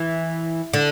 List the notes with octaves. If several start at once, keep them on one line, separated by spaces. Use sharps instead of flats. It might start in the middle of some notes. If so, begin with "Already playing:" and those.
Already playing: E3
D3